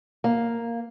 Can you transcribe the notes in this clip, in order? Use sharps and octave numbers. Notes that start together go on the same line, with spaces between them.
A#3